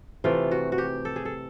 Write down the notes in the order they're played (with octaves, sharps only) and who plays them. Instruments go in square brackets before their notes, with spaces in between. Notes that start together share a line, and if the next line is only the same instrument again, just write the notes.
[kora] C3 E3 A3 F4
F#4
F#4
G4
A4
G#4
A4